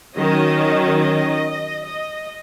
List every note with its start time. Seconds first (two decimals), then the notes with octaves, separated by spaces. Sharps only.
0.16 D#3 F#3 C#4 D#5
1.01 D#5
1.85 D#5